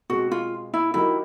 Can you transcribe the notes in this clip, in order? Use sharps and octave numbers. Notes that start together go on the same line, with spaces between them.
B2 G#3 C4 F#4
F4
E4
D#3 F#3 A#3 D#4 E4 G4